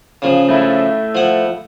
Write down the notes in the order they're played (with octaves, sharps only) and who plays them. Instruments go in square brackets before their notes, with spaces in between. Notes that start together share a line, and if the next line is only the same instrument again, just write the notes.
[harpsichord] C#3 F3
[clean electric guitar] A3 E4
[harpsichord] F3 F#5